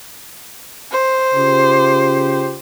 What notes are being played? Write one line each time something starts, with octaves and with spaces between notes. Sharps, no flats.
C5
C#3 F4 G4